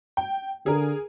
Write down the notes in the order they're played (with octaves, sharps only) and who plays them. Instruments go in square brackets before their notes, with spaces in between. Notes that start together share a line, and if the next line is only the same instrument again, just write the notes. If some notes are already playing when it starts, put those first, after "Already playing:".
[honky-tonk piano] G5
[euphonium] D3 [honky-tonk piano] G#4 A#4